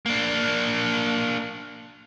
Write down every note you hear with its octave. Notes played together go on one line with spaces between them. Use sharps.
A#3 D4